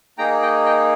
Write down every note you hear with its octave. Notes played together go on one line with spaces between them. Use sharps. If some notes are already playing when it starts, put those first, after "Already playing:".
A#3 D#4 G#4 G5 A#5
D#5 G5
D#5 G5